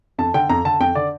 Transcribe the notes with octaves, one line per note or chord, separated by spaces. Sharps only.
F2 A5
D3 G5
F2 A#5
D3 A5
F2 G5
D3 D5